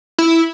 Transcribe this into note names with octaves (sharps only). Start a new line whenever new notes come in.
E4